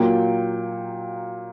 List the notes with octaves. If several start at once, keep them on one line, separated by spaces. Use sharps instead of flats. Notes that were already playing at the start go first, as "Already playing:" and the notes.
Already playing: A#2 F#3 A#3 G5